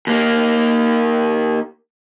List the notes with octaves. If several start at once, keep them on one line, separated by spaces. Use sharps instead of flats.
D#2 A#3